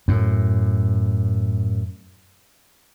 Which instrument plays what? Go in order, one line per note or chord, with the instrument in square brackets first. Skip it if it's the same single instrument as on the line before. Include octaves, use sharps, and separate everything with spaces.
[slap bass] F#2 A2